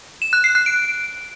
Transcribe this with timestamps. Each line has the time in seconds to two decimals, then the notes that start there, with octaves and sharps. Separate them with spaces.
0.22 E7
0.33 F#6
0.44 C7
0.55 F#6
0.66 D7